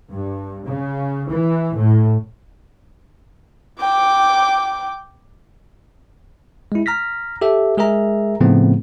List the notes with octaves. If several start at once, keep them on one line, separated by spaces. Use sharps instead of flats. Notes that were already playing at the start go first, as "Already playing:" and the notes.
G2
C#3
E3
A2
G5 D6
G#3 E4
A#5 F6 A#6 B6
G4 A4 E5
G#3 G#4 A#4 E5 A#5
A2 C#3 F3 A3 B3 C4